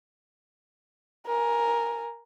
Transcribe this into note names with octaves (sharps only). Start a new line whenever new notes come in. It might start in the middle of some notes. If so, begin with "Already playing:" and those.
A#4 G#5